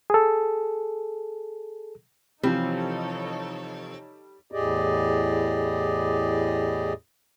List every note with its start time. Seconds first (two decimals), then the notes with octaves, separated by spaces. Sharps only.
0.10 G#4 A4
2.43 C3 E3 F3 G3 C4 D#4 A4 C#5
4.52 E2 A2 G4 G#4 D5 D#5